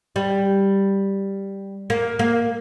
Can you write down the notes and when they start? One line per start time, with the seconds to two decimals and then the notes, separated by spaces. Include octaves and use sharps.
0.16 G3
1.90 A#3
2.19 A#3